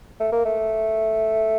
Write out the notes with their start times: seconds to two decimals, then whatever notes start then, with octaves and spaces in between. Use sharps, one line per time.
0.20 A3
0.32 A#3
0.45 A3